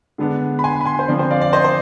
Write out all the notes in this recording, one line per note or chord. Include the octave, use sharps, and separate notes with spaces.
D3 G#3 B3 D4
B5
G#5 C6
B5
G#5 C6
C5
D3 F3 C4 D5
C5
D5 F5
D5 F5
C5 D#5
C5